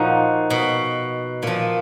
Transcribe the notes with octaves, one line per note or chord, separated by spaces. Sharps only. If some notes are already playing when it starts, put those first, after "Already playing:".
Already playing: A#2 F3 D#4 F#4
B2
A#2 F3